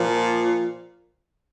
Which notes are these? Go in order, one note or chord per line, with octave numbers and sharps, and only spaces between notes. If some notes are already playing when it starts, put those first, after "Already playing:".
Already playing: A#2 F3